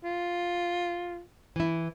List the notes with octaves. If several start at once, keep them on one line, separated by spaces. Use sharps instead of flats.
F4
E3 E4